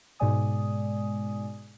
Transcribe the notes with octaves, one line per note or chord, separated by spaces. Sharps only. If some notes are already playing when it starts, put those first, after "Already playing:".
G#2 B2 G#3 D5 G#5 D#6